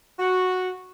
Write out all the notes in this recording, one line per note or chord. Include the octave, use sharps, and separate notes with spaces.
F#4